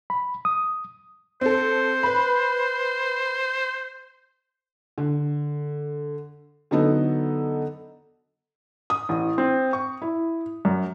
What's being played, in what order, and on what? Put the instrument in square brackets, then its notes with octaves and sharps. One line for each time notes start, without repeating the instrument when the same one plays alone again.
[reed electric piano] B5
D#6
[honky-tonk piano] C4 A4 [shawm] C5
[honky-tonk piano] B4 B5
[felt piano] D3
D3 F#3 B3 D#4 A4
D#6
A1
C4
C#6
E4
F#2